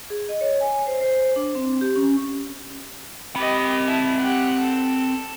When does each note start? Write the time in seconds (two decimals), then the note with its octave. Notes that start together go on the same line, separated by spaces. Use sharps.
0.10 G#4
0.29 D#5
0.41 C#5
0.61 G#5
0.87 C5
1.01 C5
1.36 D4
1.55 C4
1.81 G4
1.96 C#4
3.36 C4 G4 D#5 B5
3.87 E4 A5
4.18 G4 F#5
4.59 A4